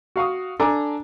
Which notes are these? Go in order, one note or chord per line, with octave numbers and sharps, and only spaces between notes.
F#4 F5 C#6 D#6
D4 A4 G#5 A#5 D6